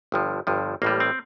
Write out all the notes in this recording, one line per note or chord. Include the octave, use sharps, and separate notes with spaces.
G1 G2 F3
G1 G2 F3
A1 A2 G3 A#3
C4